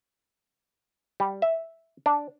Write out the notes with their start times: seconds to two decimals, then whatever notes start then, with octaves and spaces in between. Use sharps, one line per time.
1.20 G3
1.42 E5
2.06 D4